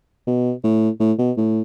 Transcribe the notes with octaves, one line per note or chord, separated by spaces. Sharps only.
B2
A2
A2
B2
A2